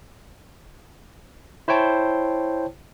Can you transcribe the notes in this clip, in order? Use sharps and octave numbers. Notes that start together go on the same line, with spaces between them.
E4 C5 C#5 G5 A5